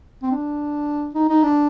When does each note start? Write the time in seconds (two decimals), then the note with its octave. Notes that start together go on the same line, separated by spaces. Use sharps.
0.23 C4
0.31 D4
1.15 D#4
1.29 D#4
1.43 D4